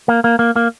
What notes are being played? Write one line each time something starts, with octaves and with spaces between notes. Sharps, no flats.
A#3
A#3
A#3
A#3